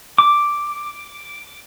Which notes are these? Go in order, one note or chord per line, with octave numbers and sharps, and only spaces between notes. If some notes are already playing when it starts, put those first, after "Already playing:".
D6